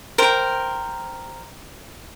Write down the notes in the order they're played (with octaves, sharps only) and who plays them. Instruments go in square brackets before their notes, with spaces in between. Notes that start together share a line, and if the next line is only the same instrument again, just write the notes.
[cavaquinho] A#4 C5 G5